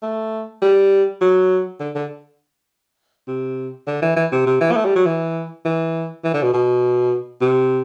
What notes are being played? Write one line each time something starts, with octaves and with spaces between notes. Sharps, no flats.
A3
G3
F#3
D3
D3
C3
D3
E3
E3
C3
C3
E3
B3
A3
G3
F#3
E3
E3
E3
D3
B2
B2
C3